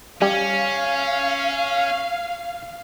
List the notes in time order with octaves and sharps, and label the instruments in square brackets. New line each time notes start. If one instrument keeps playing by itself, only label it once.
[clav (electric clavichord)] G3 [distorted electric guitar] C#4 [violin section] F5